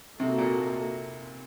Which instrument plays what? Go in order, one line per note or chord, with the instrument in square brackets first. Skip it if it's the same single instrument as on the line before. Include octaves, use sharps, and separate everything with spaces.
[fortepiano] C3 [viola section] A#3 D#4 F#4 A4
[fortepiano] A#2